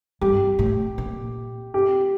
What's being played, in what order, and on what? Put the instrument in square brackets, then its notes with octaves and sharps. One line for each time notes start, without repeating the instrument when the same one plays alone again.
[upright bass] G2 [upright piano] G4
[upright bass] A2
A#2
[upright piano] G4